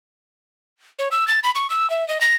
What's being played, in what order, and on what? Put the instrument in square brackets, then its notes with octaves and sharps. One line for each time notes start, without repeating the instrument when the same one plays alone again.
[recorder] C#5
E6
A6
B5
C#6
E6
E5
D#5
A#6